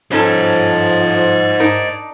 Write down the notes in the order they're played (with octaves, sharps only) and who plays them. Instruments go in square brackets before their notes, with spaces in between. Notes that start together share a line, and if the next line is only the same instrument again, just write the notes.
[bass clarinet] G#2 [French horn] F3 [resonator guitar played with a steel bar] C#4 D#4 A4 [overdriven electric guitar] C5 D#5
[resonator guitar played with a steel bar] D4 D#4 A#4